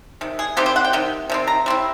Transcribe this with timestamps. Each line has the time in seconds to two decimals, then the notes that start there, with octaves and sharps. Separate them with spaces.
0.21 C3 D#3
0.39 G#4
0.57 C3 D#3 G3 C4 G4
0.66 C5
0.76 F#5
0.85 G5
0.93 C3 D#3
1.30 C3 D#3 C4
1.47 A#5
1.66 G3 C4 E4